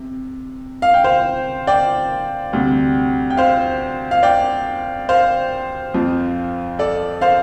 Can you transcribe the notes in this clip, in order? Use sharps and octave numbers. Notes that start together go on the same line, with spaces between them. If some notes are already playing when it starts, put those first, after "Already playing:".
Already playing: C3
F5
G5
C5 F5
D5 G5
D2 C3 G3
G5
C5 F5
F5
D5 G5
C5 F5
F2 F3
A4 D5
C5 F5